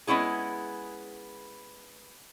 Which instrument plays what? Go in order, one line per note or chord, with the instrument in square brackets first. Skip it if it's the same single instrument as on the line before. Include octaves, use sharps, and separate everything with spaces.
[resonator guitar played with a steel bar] G#3 B3 C#4 E4 G#4